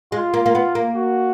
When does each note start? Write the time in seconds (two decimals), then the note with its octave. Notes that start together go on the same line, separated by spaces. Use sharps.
0.12 G#3 F4
0.34 A#3
0.46 A#3
0.55 B3
0.75 A#3
0.96 F#4